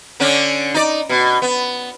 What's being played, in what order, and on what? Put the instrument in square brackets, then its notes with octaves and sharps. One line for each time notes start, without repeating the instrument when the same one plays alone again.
[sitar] D3 C#4 D4
D#4 D5
B2
B3